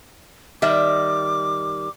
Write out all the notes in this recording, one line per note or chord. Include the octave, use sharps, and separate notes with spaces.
D#3 G3 E5 D6